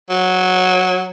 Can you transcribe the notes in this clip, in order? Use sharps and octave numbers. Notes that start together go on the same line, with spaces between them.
F#3